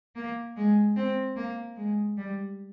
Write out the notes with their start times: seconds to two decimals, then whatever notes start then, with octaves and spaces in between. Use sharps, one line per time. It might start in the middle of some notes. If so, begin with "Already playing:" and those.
0.15 A#3
0.56 G#3
0.96 C4
1.36 A#3
1.76 G#3
2.17 G3